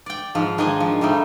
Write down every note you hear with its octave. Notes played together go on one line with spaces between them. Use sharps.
D5 G5
G#2 F3
D#3 G#3 D4 D#5 G#5
F3
D#3 G3 A3 D#4